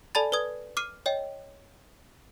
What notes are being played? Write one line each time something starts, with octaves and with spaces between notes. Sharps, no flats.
A4 D5 G#5 A5 B5 A6
B4 D5 D#6 G#6
D6 F6 C7 D#7
C#5 D#5 G5